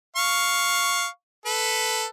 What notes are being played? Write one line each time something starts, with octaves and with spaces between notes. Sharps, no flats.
F5 C#6
A4 B4